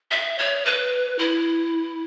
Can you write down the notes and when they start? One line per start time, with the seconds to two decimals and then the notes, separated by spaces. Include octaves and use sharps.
0.11 E5
0.39 C#5
0.65 B4
1.19 E4